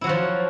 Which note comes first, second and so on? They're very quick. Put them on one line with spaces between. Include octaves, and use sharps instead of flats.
E4 F#3 F#4 F3